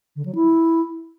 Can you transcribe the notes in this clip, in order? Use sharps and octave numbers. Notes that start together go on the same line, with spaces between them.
D3
F#3
E4